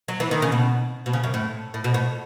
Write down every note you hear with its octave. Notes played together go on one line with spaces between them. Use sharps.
F#3
E3
D#3
C#3
B2
B2
C#3
F#2
A2
A2
B2
A2